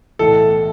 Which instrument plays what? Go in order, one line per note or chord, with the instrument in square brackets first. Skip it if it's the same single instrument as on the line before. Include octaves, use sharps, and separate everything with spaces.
[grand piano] B1 A2 E3 A4